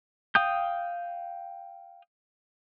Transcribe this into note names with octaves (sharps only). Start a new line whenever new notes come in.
F5 G5 D#6 G6